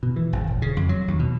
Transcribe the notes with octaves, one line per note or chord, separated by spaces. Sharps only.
B2
E3
G#1
D#1
C#3
F2
F#3
D#2
B2